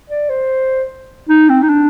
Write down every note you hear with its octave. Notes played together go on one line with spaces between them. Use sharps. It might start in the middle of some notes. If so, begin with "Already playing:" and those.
D5
C5
D#4
C4
D#4
D4